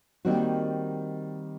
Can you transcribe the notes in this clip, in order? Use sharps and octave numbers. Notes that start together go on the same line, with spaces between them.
D#3 G3 A#3 C4 D#4 F#4